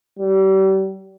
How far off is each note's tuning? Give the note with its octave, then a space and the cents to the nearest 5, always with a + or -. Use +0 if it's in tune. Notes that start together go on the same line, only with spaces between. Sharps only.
G3 -35